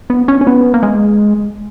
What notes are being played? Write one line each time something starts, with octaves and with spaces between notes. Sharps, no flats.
B3
C#4
C#4
B3
A#3
G#3